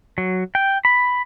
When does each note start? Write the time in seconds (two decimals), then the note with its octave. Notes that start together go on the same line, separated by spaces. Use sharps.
0.18 F#3
0.55 G5
0.85 B5